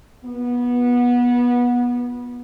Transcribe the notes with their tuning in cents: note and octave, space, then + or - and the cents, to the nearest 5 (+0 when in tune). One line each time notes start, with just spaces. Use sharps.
B3 -20 F4 +20